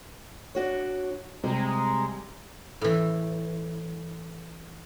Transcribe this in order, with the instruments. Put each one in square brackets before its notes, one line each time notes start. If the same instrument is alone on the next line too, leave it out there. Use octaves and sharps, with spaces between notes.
[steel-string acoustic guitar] D4 F#4 C#5
[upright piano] C3 [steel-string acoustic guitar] G3 [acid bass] G#3 [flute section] A#5
[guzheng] A2 E3